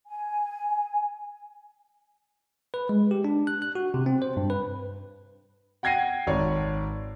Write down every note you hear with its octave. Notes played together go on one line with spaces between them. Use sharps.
G#5
B4
G#3
G4
D4
F#6
F#6
F#4
C3
C4
C5
G2
B4
F#5 G5 G#6 A#6 C7 D#7
G#1 C#5 D5